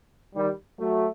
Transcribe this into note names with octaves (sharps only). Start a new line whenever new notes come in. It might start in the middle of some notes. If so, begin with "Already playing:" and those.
D#3 G3
F#3 A3